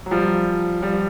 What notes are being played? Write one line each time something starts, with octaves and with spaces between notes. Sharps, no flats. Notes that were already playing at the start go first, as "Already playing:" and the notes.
F#3
F3 G3
F3 G3